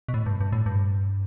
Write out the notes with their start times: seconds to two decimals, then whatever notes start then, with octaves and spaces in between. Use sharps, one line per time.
0.08 B2
0.14 A2
0.26 G2
0.40 G2
0.52 A2
0.66 G2